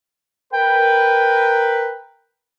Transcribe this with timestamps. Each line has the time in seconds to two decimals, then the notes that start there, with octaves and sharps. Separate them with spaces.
0.54 A#4 B4 G5